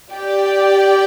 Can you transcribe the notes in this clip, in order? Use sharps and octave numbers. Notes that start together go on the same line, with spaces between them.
G4 D5 G5